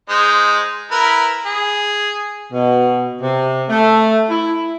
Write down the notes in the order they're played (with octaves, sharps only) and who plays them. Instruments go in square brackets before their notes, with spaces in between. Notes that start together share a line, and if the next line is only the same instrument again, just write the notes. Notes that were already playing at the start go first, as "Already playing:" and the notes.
[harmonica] G#3 D#4 C5
E4 A#4 B4
G#4
[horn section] B2
C3
A3
E4